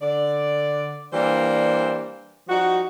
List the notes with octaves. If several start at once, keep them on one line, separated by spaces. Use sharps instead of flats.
D3 D5
E3 G3 A#3 D4 C5
F3 G3 D#4 F#4